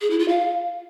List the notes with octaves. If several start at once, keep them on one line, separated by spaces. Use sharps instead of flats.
G#4
E4
F4
F5